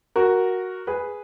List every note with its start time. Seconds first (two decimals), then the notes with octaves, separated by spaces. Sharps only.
0.16 F#4 A#4
0.87 G#4 B4